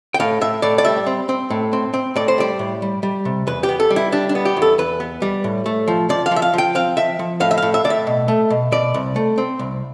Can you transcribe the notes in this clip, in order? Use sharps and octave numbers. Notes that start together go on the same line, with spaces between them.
G5
A2 F5
A2 E5
A2 D5
D5
G3 E5
C4
C4
A2
C4
C4
A2 D5
C5
G3 D5
A2
G3
G3
C3
E2 B4
G4
B3
A4
G3
E4
G3 D4
D4
B3
G4
E2
A4
E2 B4
B3
G3
A2
A3
F3
F3 D5
F5
F3
E5
F5
F3 G5
C4 F5
F3 E5
F3
A2 F5
E5
A2 F5
E5
A2 D5
E5
B2
A3
B2
B2 D5
C2
A3
C4
C2